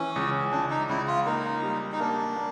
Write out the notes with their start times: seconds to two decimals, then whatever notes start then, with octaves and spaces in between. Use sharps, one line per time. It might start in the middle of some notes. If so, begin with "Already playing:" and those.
Already playing: E3 C#4
0.16 C#2
0.52 C#2 D4
0.70 D#4
0.89 C#2 E4
1.07 F4
1.26 A#3 D#4
1.63 G3
1.92 D#4
2.00 A#3 D4
2.36 A#3